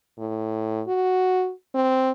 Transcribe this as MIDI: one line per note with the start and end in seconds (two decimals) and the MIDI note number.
0.19 0.82 45
0.87 1.51 66
1.75 2.12 60